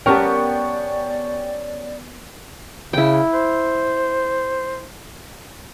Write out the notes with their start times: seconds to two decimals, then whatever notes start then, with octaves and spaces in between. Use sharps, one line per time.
0.06 B3 C#4 G4 A#4 D5 G5 A5 C#6
2.93 C#3 E4 G5
3.33 C5